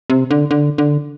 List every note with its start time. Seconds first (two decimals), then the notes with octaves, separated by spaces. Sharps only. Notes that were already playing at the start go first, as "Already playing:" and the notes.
0.10 C3
0.31 D3
0.51 D3
0.78 D3